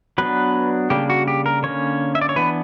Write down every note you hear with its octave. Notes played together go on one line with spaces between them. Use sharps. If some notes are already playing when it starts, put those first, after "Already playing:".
F#3 B3 D4 B4
C#3 G3 A#3 D4 G4
F#4
G4
A#4
D3 A#3 C#4 C#5
E5
D5
C#5
E3 B3 D4 B4